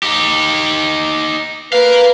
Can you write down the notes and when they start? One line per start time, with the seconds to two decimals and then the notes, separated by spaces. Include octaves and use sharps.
0.03 D#4 G4
1.73 A#4 B4 F5